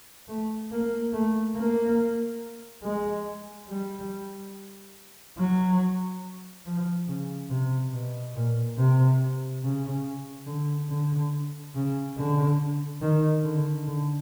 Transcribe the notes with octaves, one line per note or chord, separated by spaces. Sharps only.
A3
A#3
A3
A#3
G#3
G3
F#3
F3
C#3
C3
B2
A#2
C3
C#3
D3
D3
C#3
D3
D#3
D3
D3